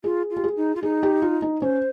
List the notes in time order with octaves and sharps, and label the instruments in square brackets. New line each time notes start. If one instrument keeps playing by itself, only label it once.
[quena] F4 [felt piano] G#4
[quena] F4
[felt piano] G4
G#4
[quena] D#4
F4
[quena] D#4 [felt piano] G#4
[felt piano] G4
F4
D#4
[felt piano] C#4 [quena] C5